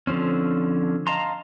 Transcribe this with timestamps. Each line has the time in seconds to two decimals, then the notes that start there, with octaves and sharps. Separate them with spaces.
0.07 D3 F3 C4 C#4
1.07 D#5 F5 A5 A#5 C6